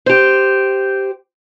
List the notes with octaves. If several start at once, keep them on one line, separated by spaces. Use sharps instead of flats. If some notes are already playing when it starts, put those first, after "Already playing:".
G4 C5